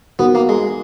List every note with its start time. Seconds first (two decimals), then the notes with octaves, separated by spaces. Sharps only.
0.19 B3 D#4 F#4 A#4
0.35 A#3
0.49 G#3